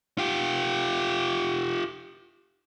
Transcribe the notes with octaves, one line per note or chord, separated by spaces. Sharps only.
F4 G4